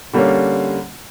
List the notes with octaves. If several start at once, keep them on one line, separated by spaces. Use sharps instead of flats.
D3 G3 A#3 C#4